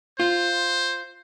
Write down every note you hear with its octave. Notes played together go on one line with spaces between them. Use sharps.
F4 C5